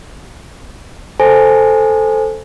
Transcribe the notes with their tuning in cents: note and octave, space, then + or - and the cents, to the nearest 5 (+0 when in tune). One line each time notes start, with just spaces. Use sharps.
A4 +0 C5 +0 G#5 +0